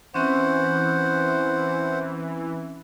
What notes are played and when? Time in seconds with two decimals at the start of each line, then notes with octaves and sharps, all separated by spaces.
0.14 E3 C4 C#4 C5 F#5